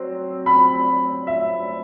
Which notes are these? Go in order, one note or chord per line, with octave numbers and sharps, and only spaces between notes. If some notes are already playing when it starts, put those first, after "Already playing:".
Already playing: F#3 C4
B5
E5